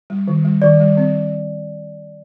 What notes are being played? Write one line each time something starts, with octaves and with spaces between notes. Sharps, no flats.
G3
D#3
G3
D#3 D5
G3
C4